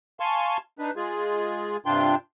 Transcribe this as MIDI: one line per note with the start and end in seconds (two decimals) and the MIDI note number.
0.20 0.57 77
0.20 0.57 80
0.20 0.57 81
0.20 0.57 84
0.20 0.57 85
0.79 0.91 62
0.79 0.91 63
0.79 0.91 71
0.96 1.77 56
0.96 1.77 65
0.96 1.77 68
1.86 2.15 43
1.86 2.15 48
1.86 2.15 62
1.86 2.15 65
1.86 2.15 79
1.86 2.15 84